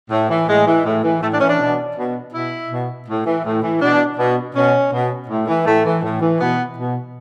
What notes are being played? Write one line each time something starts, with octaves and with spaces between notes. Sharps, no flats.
A2
E3
A2 G#3
E3
A2
E3
A2 A3
D4
E3 C#4
D4
B2
B2
B2 E4
B2
A2
E3
A2
E3
B2 D4
B2
B2 C#4
B2
A2
E3
A2 A3
E3
A2
E3
B2 B3
B2